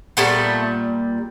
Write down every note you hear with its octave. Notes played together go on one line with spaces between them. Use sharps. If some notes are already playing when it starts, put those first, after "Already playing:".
A#2 G3 A3 B3